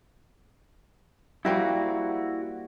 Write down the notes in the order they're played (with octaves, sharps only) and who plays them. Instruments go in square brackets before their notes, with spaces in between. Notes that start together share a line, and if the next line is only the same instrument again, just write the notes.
[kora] G3 A#3 C4 [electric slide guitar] E4 F#4